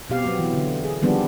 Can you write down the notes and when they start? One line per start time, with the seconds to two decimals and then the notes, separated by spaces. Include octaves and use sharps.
0.10 B2 C4 G4 F5
0.25 F#3 B3 C4
0.39 E3
0.54 D3
0.84 G#4
1.02 D#3 F3 G3 B3 C4 D4